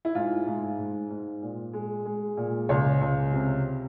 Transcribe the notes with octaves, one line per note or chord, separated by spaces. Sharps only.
E4
G#2 F4
G#2
G#2
G#2
A#2
G#3
G#3
A#2
C#2 C#5
C#2
C3